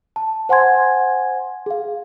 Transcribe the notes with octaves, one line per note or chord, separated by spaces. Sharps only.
A5
C5 F#5 G#5 C6 G#6
G#4 F5